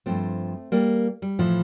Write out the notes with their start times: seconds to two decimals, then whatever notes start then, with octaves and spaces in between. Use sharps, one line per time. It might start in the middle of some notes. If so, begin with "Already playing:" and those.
0.06 G2 F3 A3 C4
0.72 G3 A#3
1.22 G3
1.39 A2 E3 F3